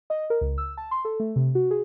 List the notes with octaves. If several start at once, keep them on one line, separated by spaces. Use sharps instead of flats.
D#5
A#4
C#2
E6
A5
C6
A4
A3
C3
F#4
G#4